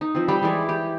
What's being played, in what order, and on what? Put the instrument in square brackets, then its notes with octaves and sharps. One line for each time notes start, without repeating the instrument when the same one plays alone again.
[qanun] D#4
F3 C4
G3 D5 G5 B5
E3 G#3 E4 D5
G4